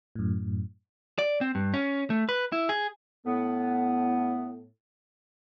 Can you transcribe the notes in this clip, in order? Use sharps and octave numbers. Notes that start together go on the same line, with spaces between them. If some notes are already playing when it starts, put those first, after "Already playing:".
F#2 A2
D5
C4
G2
C#4
A3
B4
E4
G#4
A2 B3